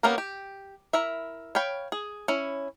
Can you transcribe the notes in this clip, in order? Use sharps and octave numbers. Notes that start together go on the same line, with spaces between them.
A#3 B3 C#4 G4 A#4
G4
E4 A#4 E5
C#5 F5 G5 B5
G#4
C#4 E4